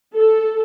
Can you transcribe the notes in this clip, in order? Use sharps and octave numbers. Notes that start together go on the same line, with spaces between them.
A4